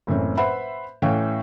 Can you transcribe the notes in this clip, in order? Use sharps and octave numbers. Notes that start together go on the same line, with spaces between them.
F#1 A2 E3 C4 C#4
B4 C5 E5 F#5 B5
A2 E3 C#4 F5 G5 C#6